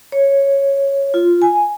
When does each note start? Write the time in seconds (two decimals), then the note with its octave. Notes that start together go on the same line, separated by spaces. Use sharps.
0.12 C#5
1.14 F4
1.42 G#5